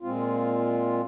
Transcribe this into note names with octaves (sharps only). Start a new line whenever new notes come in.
A#2 G#3 C4 F4